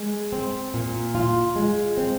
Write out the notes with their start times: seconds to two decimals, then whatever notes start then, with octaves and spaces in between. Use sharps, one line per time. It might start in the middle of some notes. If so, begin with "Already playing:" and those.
Already playing: G#3
0.32 C4
0.74 A#2
1.15 F4
1.56 G#3
1.97 C4